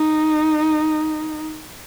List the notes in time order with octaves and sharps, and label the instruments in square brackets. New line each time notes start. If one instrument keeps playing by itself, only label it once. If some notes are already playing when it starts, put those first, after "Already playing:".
Already playing: [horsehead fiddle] D#4